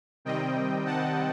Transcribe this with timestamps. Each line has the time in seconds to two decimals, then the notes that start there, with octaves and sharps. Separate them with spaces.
0.25 C3 D#3 G3 C4 D#5 G5
0.85 F#5 A5